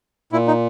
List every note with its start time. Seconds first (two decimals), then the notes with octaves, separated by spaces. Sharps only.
0.32 A#2 E4
0.48 D#4